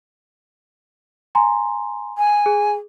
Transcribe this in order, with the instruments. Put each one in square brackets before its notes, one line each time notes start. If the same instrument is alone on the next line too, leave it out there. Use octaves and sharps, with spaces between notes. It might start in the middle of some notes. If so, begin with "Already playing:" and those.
[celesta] G#5 A#5 C6
[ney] G#5
[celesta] G#4